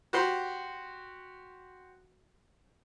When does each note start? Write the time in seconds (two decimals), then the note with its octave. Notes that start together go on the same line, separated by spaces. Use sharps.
0.13 F#4 G4 C5 C6